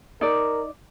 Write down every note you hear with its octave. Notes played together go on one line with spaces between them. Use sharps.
D#4 A#4 D5